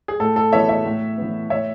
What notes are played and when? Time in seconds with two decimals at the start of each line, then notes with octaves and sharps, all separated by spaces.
0.08 G#4
0.20 A2 A4
0.36 A4
0.52 E3 B3 C#5 E5
0.69 C#5 E5
0.86 A2
1.18 E3 B3
1.50 A2 C#5 E5